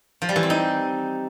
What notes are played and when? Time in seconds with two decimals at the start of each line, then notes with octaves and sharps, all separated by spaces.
0.22 F3
0.29 G3
0.36 E3
0.43 C4
0.50 D#4